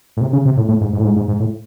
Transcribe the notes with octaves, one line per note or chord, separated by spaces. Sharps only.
A2
C3
C#3
C3
A2
A2
G#2
G#2
A2
G#2
G#2
G#2
A2